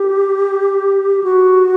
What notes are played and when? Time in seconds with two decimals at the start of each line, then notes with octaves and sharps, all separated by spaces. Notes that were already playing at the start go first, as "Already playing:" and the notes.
Already playing: G4
1.23 F#4